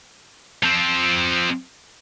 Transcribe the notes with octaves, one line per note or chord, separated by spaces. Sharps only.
F3 C4